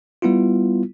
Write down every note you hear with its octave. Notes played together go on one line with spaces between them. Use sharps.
G3 B3 E4 F4